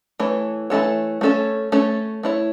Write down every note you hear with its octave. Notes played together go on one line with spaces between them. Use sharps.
E3 A3 C#5
E3 A3 C#4 A4 C#5
A3 C#4 A4 C#5
A3 C#4 A4 C#5
A3 E4 C#5